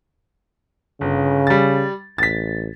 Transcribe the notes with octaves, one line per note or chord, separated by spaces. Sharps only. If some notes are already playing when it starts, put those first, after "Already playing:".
G1 C#3
G3 A6
A1 A6 B6